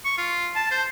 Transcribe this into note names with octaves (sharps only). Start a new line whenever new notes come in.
C#6
F4
A5
C5